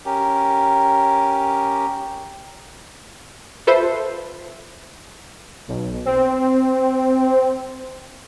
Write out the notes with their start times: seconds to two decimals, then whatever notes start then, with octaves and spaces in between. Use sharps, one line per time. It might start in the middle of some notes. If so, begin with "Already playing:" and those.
0.05 C#4 G4 A#4
3.67 F4 A4 B4 C5 E5
5.68 B1
6.05 C4